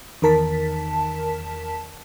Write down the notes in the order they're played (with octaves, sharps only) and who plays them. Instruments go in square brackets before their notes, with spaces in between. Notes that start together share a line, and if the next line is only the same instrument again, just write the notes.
[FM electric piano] E2 D#3 A#4 A5 B6